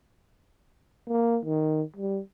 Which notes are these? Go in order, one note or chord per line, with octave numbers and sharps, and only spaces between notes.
A#3
D#3
G3